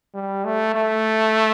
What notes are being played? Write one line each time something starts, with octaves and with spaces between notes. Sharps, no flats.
G3
A3
A3